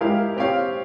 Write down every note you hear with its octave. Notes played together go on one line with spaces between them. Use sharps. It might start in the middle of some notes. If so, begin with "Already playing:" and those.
G#3 E4 G4 A#4 F5
C4 G4 C#5 F5